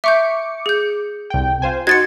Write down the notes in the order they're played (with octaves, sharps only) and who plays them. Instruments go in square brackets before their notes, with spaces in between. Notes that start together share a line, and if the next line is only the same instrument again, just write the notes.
[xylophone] E5 C#6 G6 [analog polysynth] D6 C#7
[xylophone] G#4 G6
[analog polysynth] C2 G5
F4 C5 G#5
[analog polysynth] D#4 F#4 C6 [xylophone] G#6 A6 C#7